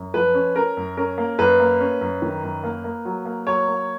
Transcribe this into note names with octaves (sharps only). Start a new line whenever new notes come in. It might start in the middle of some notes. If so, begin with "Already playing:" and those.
Already playing: F#2
F3 B4
C#4
C#4 A#4
F#2
C#4 A#4
A#3
F#2 B4
A#3
C#4
F#2
D#3
F#2
A#3
A#3
F#3
A#3
F#3 C#5
A#3